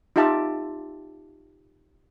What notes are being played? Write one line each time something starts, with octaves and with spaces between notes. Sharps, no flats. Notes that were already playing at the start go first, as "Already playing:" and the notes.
D#4 F4 G4 E5 A5